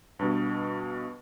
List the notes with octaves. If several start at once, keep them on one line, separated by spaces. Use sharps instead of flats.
G2 B2